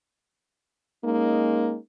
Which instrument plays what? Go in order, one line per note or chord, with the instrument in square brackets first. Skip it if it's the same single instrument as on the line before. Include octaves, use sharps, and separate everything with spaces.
[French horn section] G#3 A#3 C#4 D#4